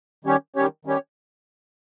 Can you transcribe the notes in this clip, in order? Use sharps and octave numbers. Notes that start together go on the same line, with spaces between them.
D#3 G3 C#4 G4 C#5
D#3 G3 C#4 G4 C#5
D#3 G3 C#4 G4 C#5